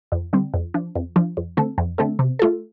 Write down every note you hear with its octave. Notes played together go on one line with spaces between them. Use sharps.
F2
D3 G3 C4
F2
F3 D4
F2
F3 D4
F2
D3 A3 C4 A4
F2
D3 A3 C4 A4
C3
A3 F4 A4